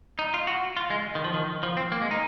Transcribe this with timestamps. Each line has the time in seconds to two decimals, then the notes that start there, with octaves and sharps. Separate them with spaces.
0.19 D#4
0.34 F4
0.47 F#4
0.77 F4
0.90 G#3
1.15 D#3
1.24 F3
1.34 D#3
1.63 F3
1.77 C4
1.92 A#3
2.01 G#3
2.11 D#4